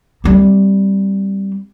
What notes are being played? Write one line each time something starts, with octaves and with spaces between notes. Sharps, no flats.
G3 C4